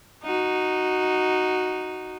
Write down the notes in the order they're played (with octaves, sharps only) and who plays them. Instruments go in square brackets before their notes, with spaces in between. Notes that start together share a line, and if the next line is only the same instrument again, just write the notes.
[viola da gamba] D#4 F#4